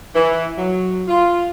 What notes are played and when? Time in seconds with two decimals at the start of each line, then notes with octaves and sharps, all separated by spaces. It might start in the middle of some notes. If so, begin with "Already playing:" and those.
0.15 E3
0.57 F#3
1.08 F4